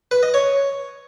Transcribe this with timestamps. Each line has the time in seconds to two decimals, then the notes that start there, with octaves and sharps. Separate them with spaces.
0.11 B4
0.23 D#5
0.34 C#5